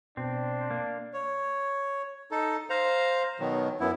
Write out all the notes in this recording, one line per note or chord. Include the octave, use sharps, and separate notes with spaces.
B2 C4 D4
A#3
C#5
D#4 A4
C5 F5 A#5
B2 D#3 F#3
F#2 B3 E4